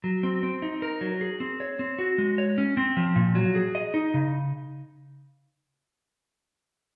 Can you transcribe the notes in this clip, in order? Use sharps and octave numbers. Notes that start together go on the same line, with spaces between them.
F#3
C4
C4
D#4
A#4
F#3
G#4
C4
C#5
C4
F#4
G#3
C#5
C#4
C4
F3
A#2
F#3
G#4
D#5
D#4
C#3